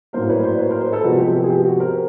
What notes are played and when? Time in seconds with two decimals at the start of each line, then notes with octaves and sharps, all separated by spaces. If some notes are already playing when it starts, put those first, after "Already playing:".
0.13 A2 F#3 A#3 A#4 C5
0.29 B4 C#5
0.43 C5 D5
0.58 B4 C#5
0.70 A#4 C5
0.81 A#4 C5
0.92 A4 B4
1.04 C3 F3 G#3 B3 F#4
1.20 G4
1.34 G4
1.44 G#4
1.50 G4
1.64 F#4
1.80 A#4 C5